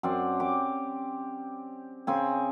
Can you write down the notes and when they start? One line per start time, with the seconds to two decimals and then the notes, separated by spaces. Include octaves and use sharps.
0.03 F#2 C4 D5
0.40 G4 D6
2.07 C#3 C4 G#5